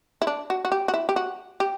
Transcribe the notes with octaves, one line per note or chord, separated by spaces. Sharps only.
E4
D4
F#4
F#4
G4
F#4
E4
G4
F#4
G4